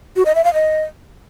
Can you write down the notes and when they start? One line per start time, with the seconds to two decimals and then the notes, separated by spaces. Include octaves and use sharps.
0.16 F#4
0.26 D#5
0.35 E5
0.44 F5
0.54 D#5